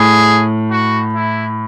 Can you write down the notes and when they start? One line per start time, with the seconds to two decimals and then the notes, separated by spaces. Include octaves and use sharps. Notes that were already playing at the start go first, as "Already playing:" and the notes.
Already playing: A2 G#4
0.71 F#4
1.15 E4